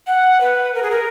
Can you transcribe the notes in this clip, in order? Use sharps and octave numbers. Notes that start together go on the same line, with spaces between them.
F#5
B4
A#4
G#4
A#4